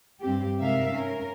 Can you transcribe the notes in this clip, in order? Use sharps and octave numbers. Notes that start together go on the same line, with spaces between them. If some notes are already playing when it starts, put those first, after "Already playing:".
G2 C4 G4
G#2 C3 A#4 E5 F5
C#4 A#4